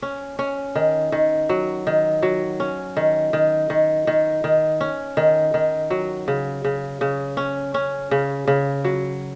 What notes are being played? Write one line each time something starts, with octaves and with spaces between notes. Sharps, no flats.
C#4
C#4
D#3
D#3
F#3
D#3
F#3
C#4
D#3
D#3
D#3
D#3
D#3
C#4
D#3
D#3
F#3
C#3
C#3
C#3
C#4
C#4
C#3
C#3
F#3